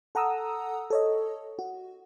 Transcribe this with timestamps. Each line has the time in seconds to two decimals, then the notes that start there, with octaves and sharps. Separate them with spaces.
0.15 A4 F#5 A#5 D#6 E6
0.90 A4 C#5 D#5
1.59 F#4